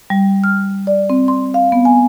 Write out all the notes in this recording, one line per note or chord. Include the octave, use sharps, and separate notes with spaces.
G3
F6
D5
C4
C6
F5
B3
G#5